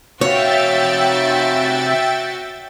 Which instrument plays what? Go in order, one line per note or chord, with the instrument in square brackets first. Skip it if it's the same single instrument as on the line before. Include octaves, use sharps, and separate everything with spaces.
[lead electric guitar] C3 F5 [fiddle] F#4 [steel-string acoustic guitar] C#5 [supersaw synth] E5 G5 A6